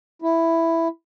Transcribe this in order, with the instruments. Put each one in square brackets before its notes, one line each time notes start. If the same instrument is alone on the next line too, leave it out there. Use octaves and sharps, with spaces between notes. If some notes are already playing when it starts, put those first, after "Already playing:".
[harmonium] E4